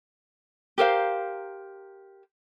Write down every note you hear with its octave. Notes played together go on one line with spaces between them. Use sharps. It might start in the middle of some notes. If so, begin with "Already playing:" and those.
G4 A#4 C5 F5